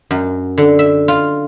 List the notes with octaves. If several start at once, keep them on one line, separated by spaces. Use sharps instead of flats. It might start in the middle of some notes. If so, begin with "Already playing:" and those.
F#2
D3
E5
F4